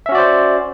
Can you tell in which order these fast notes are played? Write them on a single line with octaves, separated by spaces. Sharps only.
E5 C#4 F#4 D5 C5